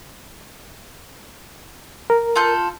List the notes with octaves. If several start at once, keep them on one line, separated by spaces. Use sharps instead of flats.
A#4
F4 A4 G6